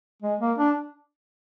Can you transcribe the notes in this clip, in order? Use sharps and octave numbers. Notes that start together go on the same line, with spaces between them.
G#3
A#3
D4